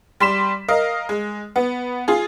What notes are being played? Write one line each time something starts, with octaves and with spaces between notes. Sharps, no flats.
G3 C6 B6 E7
A#4 D#5 F5
G#3
B3
F4 G#4